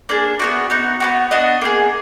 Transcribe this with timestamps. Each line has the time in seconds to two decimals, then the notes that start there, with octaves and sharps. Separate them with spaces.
0.09 A#3 D4 G#4
0.39 B3 D#4 F#4 D5
0.70 B3 D#4 F#4
1.00 B3 D4 F#4
1.31 B3 D4 F#4 D#5
1.61 A#3 D#4 G#4